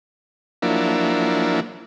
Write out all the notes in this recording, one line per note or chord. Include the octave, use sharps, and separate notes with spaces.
F3 F#3 A#3 D4 E4